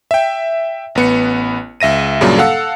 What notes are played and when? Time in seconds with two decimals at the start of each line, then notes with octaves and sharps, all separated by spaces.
0.11 E5 G5
0.95 A1 B3 C#7
1.80 C#2 E5 A#6 D#7
2.21 G2 A#2 C#3 F#3 A#3 D4
2.38 A4 F5 F#5 E6